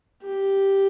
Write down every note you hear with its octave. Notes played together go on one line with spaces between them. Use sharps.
G4